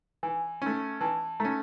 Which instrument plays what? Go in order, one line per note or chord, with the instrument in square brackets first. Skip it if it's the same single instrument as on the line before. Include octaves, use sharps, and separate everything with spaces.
[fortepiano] E3 [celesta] G#5
[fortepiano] A3 C#4
[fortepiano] E3 [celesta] A5
[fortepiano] A3 C#4 [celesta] A#5